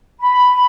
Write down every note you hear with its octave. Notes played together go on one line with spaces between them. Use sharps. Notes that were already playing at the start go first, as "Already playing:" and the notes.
B5